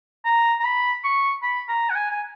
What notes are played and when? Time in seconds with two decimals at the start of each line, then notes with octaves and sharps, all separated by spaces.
0.25 A#5
0.60 A#5
0.64 B5
1.04 C#6
1.43 B5
1.68 A#5
1.90 F#5
1.95 G#5
2.11 G#5